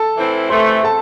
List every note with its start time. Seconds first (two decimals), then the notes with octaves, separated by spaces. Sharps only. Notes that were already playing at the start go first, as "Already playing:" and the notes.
Already playing: A4 A5
0.16 A2 E3 C4 E4
0.49 C3 E3 A3 C5 C6
0.83 A4 A5